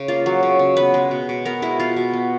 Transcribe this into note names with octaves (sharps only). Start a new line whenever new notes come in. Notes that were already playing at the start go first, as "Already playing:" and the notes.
Already playing: C#3
A#3 F4
F#3
C#3
C#3
B3 B4
G#3
B2
B2
B3 A#4
G#3 E4
B2 F4
B2
B3